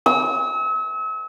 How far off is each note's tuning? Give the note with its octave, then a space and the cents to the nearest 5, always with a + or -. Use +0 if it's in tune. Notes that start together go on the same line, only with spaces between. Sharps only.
E6 -40